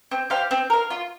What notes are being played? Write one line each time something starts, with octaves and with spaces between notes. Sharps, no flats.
C4
G4 C5 F5
C4
A#4 F5
F4